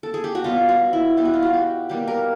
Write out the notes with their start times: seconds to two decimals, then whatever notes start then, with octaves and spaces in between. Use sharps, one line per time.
0.03 A4
0.14 G#4
0.24 G4
0.35 F#4
0.44 B2 G3 B3 F4
0.69 F#4
0.93 E4
1.17 B2 G3 B3 G4
1.25 F#4
1.34 F4
1.43 F#4
1.53 G4
1.89 B2 G3 A#3 G4
2.08 A#4